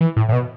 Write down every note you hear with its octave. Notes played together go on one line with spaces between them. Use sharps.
E3
A2
A2
B2